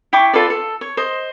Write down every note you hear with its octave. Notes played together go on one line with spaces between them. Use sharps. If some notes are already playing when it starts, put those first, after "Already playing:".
E4 G5 C#6 D6
F4 A4 B4 D5
A4
C#5
C5 D#5